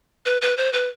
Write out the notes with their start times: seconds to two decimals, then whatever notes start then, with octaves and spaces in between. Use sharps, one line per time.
0.26 B4
0.42 B4
0.57 C5
0.73 B4